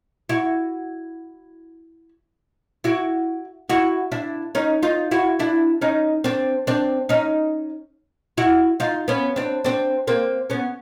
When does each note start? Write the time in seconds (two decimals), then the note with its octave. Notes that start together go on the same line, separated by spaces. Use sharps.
0.29 E4 F#4
2.84 E4 F#4
3.70 E4 F#4
4.12 D4 E4
4.55 C#4 D#4
4.83 D#4 F4
5.11 E4 F#4
5.39 D4 E4
5.81 C#4 D#4
6.24 C4 D4
6.67 C4 D4
7.09 C#4 D#4
8.38 E4 F#4
8.80 D#4 F4
9.08 B3 C#4
9.36 C4 D4
9.64 C4 D4
10.07 A#3 C4
10.50 B3 C#4